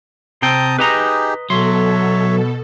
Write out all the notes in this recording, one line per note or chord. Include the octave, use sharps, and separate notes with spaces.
C3 C4 G5 A5 A#5 D#6
D#4 G4 G#4 B4 D#5 A#5
B2 F#3 A4 C#5 E5 C6